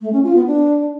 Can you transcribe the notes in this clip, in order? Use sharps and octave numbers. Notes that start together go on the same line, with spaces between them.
A3
C#4
F4
B3
D4